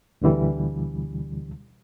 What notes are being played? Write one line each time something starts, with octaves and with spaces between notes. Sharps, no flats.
D2 B2 D3 E3 G3